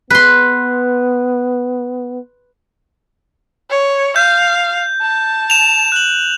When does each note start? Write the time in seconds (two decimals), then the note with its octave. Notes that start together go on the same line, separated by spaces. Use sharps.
0.10 B3 B4 C6
3.70 C#5
4.16 F5 G6
5.01 A5
5.50 E7 F7
5.92 F#6 F#7